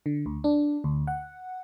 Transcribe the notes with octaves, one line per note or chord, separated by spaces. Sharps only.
D3
D2
D4
D2
F#5